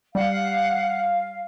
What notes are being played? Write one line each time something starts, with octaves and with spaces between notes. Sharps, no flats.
G3 F5 F#5